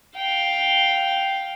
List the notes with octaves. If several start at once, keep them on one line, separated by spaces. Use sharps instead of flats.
F5 G5